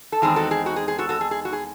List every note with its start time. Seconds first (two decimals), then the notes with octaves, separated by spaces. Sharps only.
0.12 A4
0.22 E2 D#3 G#3 C4 D#4 G#4
0.36 F#4 A4
0.51 G#4
0.66 F#4
0.76 G#4
0.88 G#4
0.99 F#4 A4
1.09 F#4 A4
1.21 G#4
1.31 G#4
1.45 F#4
1.53 G#4